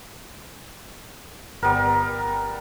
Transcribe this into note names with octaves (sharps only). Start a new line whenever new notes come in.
G1 G3 B3 A#4